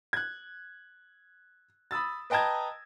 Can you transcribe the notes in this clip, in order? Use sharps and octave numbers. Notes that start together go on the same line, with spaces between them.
F#6 G#6
B5 D#6 E6 A6
B4 D#5 G5 A5 A#5 G#6